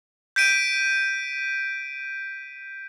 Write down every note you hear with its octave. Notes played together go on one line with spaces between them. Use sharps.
G6 B6 D7 D#7